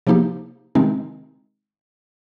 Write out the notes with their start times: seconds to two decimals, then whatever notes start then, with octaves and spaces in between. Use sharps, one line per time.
0.07 C3 F3 A#3 D#4 G4
0.75 C3 D#3 G#3 C4 D#4